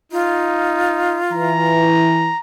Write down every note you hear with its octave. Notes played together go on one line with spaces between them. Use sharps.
D#4 F4
E3 A#5